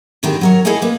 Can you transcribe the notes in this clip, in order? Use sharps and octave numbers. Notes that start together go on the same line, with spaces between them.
A2 D3 D#3 G#3 C4 G4
F#3 A#4 C#5
E4 G#4 A4 C#5 D#5 G#5
A#3 B4